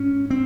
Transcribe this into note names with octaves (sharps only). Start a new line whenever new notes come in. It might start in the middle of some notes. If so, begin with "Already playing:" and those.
Already playing: G#2 C#4
C4